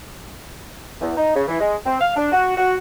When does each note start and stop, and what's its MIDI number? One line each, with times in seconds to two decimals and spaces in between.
1.01 1.15 40
1.17 1.33 63
1.36 1.44 49
1.48 1.60 52
1.60 1.76 56
1.86 1.99 60
2.01 2.15 77
2.16 2.31 62
2.32 2.55 66
2.57 2.76 66